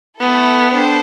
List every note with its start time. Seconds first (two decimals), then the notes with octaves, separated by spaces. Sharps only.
0.19 A3 B3 E4 A4
0.71 D4 A4 C5 G5